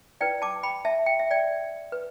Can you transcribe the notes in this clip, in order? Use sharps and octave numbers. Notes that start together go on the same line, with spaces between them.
E4 B4 D5 G5
A5 D6
G5 B5
E5 A5
G5
E5
D5 G5
B4